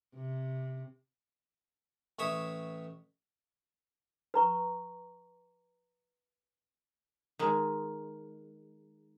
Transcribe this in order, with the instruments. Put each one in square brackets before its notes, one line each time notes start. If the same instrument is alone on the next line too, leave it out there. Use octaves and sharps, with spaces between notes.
[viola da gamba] C3
[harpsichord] A1 C#5 E5 D#6
[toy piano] B4 A#5 C#6
[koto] D#3 G#3